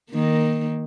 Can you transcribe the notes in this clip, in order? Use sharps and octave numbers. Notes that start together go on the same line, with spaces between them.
D#3 A#3